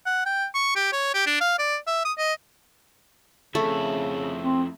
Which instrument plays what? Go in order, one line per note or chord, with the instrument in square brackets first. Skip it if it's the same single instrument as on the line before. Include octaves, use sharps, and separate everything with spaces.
[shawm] F#5
G5
C#6
G4
C#5
G4
D4
F5
D5
E5
D#6
D#5
[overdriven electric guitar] F2 E4 [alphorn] C#3 [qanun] A3
[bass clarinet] C4